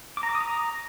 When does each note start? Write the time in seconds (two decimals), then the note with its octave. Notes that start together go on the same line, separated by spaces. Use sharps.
0.17 D6
0.23 A#5
0.29 D6
0.35 D#6
0.41 A#5